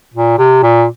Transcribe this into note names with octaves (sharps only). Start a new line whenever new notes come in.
A#2
C3
A#2